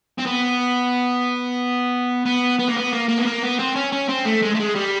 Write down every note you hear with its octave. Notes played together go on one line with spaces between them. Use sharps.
C4
B3
B3
B3
A#3
B3
A#3
A#3
B3
A#3
B3
C4
C#4
C#4
C4
A3
G#3
A3
G#3
G3